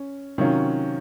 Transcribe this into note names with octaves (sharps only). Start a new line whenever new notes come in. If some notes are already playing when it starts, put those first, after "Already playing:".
Already playing: C#4
C3 D#3 F#3 C#4 F4